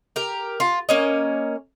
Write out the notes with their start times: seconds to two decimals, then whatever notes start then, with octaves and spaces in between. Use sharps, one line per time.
0.16 G4 A#4
0.60 F4
0.89 A#3 C#4 D#5